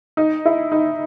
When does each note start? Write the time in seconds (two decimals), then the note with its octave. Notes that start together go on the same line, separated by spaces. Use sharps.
0.17 D#4
0.45 E4
0.72 D#4